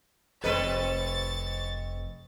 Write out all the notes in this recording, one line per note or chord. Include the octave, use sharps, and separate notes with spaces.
F1 F3 C4 A4 B4 D#5 C#6 A6